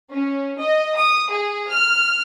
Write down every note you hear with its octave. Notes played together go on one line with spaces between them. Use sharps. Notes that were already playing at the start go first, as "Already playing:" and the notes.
C#4
D#5
D#6
G#4
F6